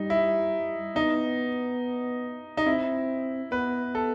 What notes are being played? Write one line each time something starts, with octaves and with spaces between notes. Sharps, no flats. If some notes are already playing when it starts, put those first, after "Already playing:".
Already playing: G3 D#4
E4
B3 D#4
D#4
C4 E4
B3 B4
A4